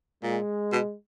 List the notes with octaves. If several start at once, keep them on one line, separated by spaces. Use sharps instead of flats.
A#2 G#3
B2